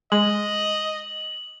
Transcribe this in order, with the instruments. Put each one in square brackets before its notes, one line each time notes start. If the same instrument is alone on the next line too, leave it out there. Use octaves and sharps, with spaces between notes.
[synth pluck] G#3 [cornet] D#5 [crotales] F#7